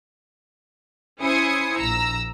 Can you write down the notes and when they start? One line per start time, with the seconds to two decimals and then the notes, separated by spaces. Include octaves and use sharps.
1.21 C#4 E4 C5 G#5 D#6 C#7
1.78 A#1 A#5 E6